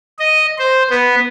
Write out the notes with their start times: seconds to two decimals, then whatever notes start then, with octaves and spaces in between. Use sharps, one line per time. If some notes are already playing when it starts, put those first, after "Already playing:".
0.19 D#5
0.59 C5
0.90 B3